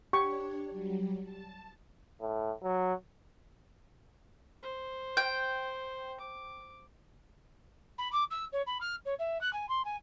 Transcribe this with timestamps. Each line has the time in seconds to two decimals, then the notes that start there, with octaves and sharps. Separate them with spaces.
0.13 D4 G4 C#5 C#6
0.70 F#3 G3
1.24 A5
2.21 A2
2.62 F#3
4.62 C5
5.17 G5
6.20 D6
7.98 B5
8.12 D6
8.31 E6
8.53 C#5
8.67 B5
8.81 F6
9.06 C#5
9.19 E5
9.41 F#6
9.53 G#5
9.69 C6
9.85 G#5